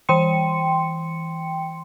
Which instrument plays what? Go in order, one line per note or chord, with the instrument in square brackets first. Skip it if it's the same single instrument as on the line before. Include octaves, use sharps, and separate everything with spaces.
[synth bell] E3 G5 C6 C#7